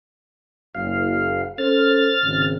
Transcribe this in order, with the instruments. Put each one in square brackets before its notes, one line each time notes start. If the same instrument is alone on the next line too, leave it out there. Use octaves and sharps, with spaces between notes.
[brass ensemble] F#1 [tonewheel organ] F5
[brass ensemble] C#4 A4 C5 [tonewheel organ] F6 A6
[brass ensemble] G#1 G#2 C#3